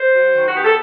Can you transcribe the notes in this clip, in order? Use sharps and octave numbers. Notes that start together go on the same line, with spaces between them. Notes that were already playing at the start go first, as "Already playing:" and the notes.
Already playing: C5
F#3
D#3
F#4
B3 G4
A4